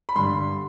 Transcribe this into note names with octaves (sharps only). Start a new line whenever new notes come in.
B5
G2 D3 G3 C6